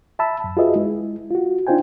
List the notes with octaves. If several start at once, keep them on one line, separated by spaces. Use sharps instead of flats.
E5 A5 B5 E6
F#2
F4 F#4 G#4 B4 D#5 E5
G#3 E4
F4 F#4
D4 D#4 F4 C5 G5 G#5